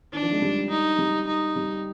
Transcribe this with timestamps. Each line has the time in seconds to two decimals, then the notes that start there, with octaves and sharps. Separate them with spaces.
0.13 D#3 D4
0.22 F3
0.32 G#3
0.42 G3
0.70 D#4
0.99 G3
1.27 D#4
1.56 G3